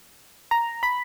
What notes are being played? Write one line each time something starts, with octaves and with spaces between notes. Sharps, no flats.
A#5
B5